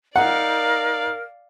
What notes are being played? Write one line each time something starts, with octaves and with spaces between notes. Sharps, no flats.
D#4 A#4 D5 F5 F#5